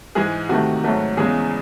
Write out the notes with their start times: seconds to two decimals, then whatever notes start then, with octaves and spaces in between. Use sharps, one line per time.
0.15 G#2 E3 G#3 G#4
0.49 C3 D#3 A3 F#4
0.84 G#2 F#3 A3 F#4
1.17 E2 C#3 E3 G#3 G#4